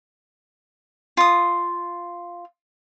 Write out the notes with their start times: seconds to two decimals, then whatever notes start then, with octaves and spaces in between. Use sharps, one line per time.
1.17 F4 D#6